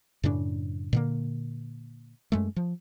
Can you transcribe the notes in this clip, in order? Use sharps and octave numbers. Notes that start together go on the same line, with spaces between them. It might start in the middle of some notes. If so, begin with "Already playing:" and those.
F#2 A2 C#3 D4
A#2 D3 A#3
F#2 G#3 A3
F3